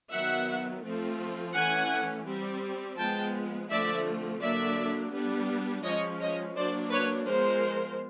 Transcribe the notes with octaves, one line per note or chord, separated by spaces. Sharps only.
D#3 F#3 B3 E5 F#5
F3 A3 C4
E3 A3 C#4 F#5 G#5
G3 C4
F3 G#3 B3 G5 A5
D3 F3 A3 C4 D5 E5
D3 F#3 A#3 D4 D5 E5
G3 B3 D4
F3 G#3 C#4 C#5 D#5
C#5 D#5
F#3 A#3 D4 C5 D5
B4 C#5
F3 G#3 B3 A#4 C5